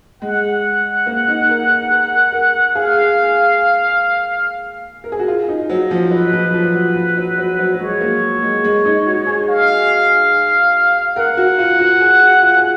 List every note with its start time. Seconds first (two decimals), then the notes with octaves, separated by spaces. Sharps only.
0.22 G#3 F#5
1.06 A#3
1.28 D#4
1.49 A#4
1.70 A#4
1.91 A#4
2.32 A#4
2.75 G#4 F5
5.04 A#4
5.12 G#4
5.19 F#4
5.28 F4
5.48 D#4
5.70 F#3
5.91 F3
6.11 F#3 B4
6.33 F3
6.54 F3
6.75 F#3
6.95 F3
7.17 F#3
7.38 F#3
7.59 F#3
7.74 F#3
7.79 G#3 C#5
8.00 A#3
8.42 G#3
8.64 G#3
8.85 D#4
9.06 F#4
9.27 G#4
9.48 F5
11.16 A#4 F#5
11.37 F#4
11.59 F4
11.80 F#4
12.01 G#4
12.22 F#4
12.43 F4
12.57 G#4